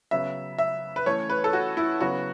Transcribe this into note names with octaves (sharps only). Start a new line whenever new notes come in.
C#3 F#3 B3 E5
E5
B4
E3 A3 C#4 C#5
B4
A4
F#4
E4
C#3 F#3 B3 F#4